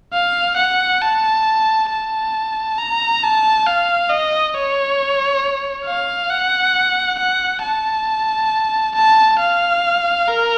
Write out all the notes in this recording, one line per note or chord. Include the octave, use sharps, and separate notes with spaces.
F5
F#5
A5
A5
A#5
A5
F5
D#5
C#5
F5
F#5
F#5
A5
A5
F5
A#4